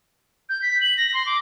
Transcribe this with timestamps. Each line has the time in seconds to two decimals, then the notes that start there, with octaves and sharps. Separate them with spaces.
0.49 G6
0.62 B6
0.81 F#7
0.98 A#6
1.14 C6
1.26 D6